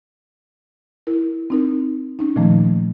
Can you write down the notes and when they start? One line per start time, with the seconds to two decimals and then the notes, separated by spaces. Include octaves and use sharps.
1.07 E4 A#4
1.50 C4 D#4 A#4
2.19 C#4 D#4
2.36 A#2 D#3 F3 A3 A#3